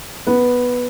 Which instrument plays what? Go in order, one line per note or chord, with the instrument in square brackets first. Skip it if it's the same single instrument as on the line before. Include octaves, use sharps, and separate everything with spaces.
[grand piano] B3 B4